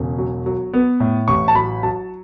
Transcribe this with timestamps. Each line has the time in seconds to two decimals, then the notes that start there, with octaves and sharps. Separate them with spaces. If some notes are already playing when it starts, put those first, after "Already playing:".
Already playing: E1 C#3
0.18 F#3
0.46 F#3
0.74 B3
1.00 A2
1.28 A1 C#6
1.48 A5
1.55 F#3 B5
1.83 F#3 A5